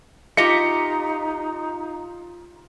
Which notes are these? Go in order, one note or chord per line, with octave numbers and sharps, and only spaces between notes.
D#4 F4 G4 D#5 E5 C#7